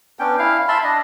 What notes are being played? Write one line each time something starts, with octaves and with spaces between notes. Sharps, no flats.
B3 C#4 D4 G5
E4 F5
E5 A5 B5 C6
D4 D#5